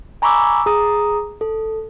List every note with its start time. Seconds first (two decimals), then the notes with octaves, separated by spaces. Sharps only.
0.22 G#5 A#5 B5 C#6 D6 E6
0.66 G#4 A#5 D#6
1.41 A4